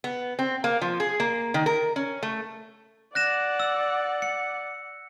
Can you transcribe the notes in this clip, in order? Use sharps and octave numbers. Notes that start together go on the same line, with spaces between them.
B3
C4
A#3
F3
G#4
A#3
D#3
A#4
C#4
A3
D5 F#5 F#6 A#6 E7
E6
C#7